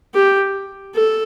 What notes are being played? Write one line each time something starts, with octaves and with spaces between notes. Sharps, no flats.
G4
A4